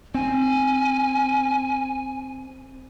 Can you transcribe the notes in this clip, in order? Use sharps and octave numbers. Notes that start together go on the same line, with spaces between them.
C4 G#5